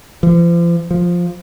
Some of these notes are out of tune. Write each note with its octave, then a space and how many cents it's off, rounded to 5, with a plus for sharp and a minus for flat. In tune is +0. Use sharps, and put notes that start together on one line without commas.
F3 -40
F3 +5